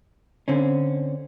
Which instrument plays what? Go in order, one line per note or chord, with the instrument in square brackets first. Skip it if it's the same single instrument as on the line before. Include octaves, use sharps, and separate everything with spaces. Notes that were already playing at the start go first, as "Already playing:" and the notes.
[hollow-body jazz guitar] D3 C4 C#4